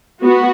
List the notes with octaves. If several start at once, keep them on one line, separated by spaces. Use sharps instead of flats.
B3 F#4